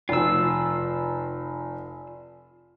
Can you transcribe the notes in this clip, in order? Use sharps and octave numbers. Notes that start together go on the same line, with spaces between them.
F1 F4 E6